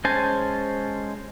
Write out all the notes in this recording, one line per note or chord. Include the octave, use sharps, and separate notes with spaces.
G#3 C#4 C5 G#5 A5